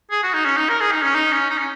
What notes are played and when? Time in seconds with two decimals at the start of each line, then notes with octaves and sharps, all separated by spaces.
0.11 G#4
0.23 F#4
0.33 D#4
0.45 C#4
0.57 D#4
0.69 A#4
0.81 G#4
0.92 D#4
1.03 C#4
1.15 D#4
1.32 C#4
1.50 D#4
1.58 C#4